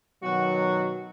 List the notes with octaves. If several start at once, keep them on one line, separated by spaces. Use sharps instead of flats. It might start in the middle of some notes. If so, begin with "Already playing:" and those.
B2 D#3 F#3 F#4